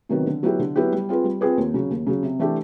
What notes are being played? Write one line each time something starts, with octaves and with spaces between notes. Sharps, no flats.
C3 D#3 F#3 B3
D3
F#3 B3 E4 G4
D3
F#3 B3 E4 G4
G3
C4 F4 G#4 B4
G3
C4 F4 G#4 B4
D#2
C#3 F#3
D#2
C#3 F#3
C3
E3 A3 D4 G4